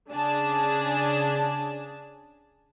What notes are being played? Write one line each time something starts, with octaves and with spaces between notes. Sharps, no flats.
C#3 D4 G#4 A5